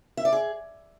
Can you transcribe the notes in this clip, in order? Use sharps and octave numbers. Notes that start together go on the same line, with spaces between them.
E5
D5
G#4